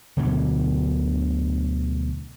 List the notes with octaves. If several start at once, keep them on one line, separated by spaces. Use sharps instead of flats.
D2 B2 D3 F#3